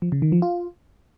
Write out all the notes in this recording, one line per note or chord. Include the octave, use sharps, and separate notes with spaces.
F3
C#3
D#3
F3
F4